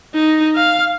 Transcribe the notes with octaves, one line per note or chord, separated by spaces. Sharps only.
D#4
F5